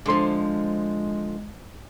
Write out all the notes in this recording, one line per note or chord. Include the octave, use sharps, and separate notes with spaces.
D3 F3 G#3 D4 A4 C5